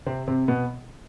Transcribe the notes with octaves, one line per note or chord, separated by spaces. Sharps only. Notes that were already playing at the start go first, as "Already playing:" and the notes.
C3 C4
C3 C4
B2 B3